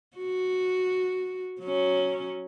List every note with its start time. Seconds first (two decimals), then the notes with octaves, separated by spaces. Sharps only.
0.17 F#4
1.60 F#3 C#4